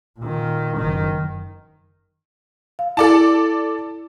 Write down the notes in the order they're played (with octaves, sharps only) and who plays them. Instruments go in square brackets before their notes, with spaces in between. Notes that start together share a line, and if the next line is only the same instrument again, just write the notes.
[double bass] A#2 D#3
F#1 D#3
[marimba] F5
[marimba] E4 [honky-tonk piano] A4 D5 A5